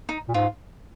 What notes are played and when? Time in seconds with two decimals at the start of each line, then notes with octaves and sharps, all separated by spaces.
0.09 D#4
0.28 A#2
0.34 G#2 F4